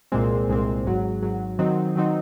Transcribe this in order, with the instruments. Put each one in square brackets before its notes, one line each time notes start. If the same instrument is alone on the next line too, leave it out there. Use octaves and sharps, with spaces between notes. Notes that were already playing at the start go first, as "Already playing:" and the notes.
[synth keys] C2 A#2 G#3 C4
C2 A#2 G#3 C4
G#1 G#2 F#3
G#1 G#2 F#3
D#3 F#3 C4 D#4
D#3 F#3 C4 D#4